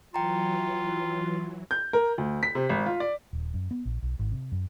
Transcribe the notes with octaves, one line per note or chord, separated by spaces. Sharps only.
E3 F#3 F4 G5 A#5
G6
A#4
D2
B6
C3
G#1
F4
D5
D#1
F#2
B3
A#1
B1
G#1
C3
F#2